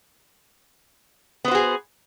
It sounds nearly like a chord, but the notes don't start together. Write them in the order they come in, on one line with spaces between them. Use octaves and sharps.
B3 C5 F#4 G#4